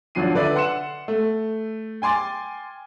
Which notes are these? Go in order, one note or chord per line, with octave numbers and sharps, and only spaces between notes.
G#1 F3 F#3 D4 C7 D#7
D3 B4 D5 E5
F#5 C6 F#6 C#7 E7
A3
G5 G#5 C6 D6 A6